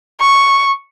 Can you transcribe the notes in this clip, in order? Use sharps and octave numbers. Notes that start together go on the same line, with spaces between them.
C#6